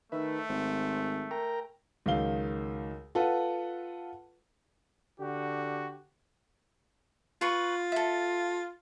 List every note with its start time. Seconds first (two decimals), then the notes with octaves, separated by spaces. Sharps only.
0.12 D#3 A3 B4 E5
0.49 G#1 C5
1.31 A#4 G5 A#5
2.06 C#2 D#3 F#3 F5 G7
3.15 F4 A4 B4 F#5
5.20 D3 F#4 G4
7.41 F4 B4 C#6
7.92 A4 E5